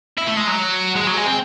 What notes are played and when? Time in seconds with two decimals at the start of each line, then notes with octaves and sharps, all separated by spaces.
0.18 E4
0.27 A3
0.37 G#3
0.47 F#3
0.96 G#3
1.07 F#3
1.17 G#3
1.26 C4